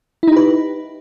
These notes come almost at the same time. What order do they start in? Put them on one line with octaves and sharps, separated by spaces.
E4 D#4 G4 B4